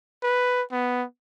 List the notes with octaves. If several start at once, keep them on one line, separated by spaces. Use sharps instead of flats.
B4
B3